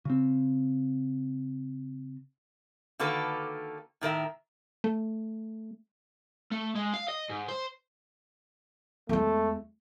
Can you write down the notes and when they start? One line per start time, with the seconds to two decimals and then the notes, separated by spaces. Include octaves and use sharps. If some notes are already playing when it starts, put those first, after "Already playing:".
0.05 C#3 C4
2.99 D3 D#3 A#3 F#4 A4 B4
4.01 A2 D#3 A#4 E5
4.84 A3
6.52 A3
6.76 G#3
6.94 F5
7.09 D#5
7.30 G#2
7.49 C5
9.09 E2 G#3 A3